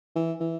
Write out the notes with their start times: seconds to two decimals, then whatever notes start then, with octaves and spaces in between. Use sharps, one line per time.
0.16 E3
0.41 E3